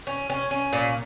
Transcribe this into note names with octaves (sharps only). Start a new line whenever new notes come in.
C#4
C#4
C#4
A#2